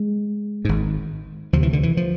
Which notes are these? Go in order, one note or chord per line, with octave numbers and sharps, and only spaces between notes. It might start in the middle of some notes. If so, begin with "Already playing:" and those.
Already playing: G#3
G#1 G#2
D2 C3 F3
E3
D3
E3
F3